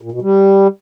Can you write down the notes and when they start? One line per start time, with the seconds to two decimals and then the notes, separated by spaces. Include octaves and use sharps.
0.02 A#2
0.12 B2
0.22 G3